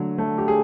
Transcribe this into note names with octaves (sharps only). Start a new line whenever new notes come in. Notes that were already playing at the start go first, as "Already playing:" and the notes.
Already playing: D3 F#3 A3
A3
G4
G#4